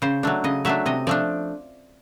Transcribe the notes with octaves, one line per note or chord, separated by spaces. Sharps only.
C#3 C5
F#3 A3 D4
C#3 D#5
F#3 A3 D4 E5
C3 D#5
F3 A3 D4 D5